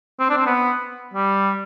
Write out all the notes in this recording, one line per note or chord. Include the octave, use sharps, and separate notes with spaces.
C4
D4
C4
B3
G3